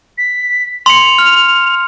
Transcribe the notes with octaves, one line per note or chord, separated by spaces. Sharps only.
B6
C6 C#7 F7
F6